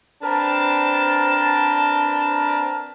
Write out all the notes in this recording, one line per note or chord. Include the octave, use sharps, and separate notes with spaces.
C4 D4 A#4 B4 A5